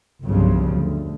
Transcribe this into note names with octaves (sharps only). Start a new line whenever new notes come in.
G1 C2 G2 C#3 F3 F#3
D2